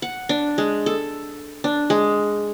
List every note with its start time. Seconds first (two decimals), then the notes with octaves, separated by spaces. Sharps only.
0.02 F#5
0.29 D4
0.58 G#3
0.86 A4
1.64 D4
1.90 G#3